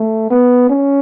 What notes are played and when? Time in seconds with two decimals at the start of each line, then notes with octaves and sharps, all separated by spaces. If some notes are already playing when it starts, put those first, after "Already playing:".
Already playing: A3
0.30 B3
0.70 C#4